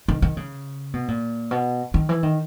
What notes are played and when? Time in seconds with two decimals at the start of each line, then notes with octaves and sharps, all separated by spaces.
0.08 D#3
0.22 D#3
0.37 C#3
0.94 B2
1.08 A#2
1.51 B2
1.94 D#3
2.09 E3
2.23 D#3